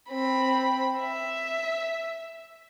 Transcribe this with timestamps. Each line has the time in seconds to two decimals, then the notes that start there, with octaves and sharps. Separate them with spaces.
0.10 C4 B5
0.99 E5